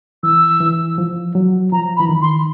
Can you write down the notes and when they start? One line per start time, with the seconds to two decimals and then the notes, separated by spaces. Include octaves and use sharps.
0.23 E3 E6
0.60 E3
0.98 F3
1.35 F#3
1.72 F3 A#5
1.97 B5
2.00 E3
2.09 D#3
2.22 C6